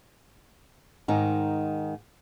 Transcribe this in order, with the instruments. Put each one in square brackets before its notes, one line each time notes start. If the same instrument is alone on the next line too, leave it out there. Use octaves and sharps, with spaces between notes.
[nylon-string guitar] G#2 D#3 D#4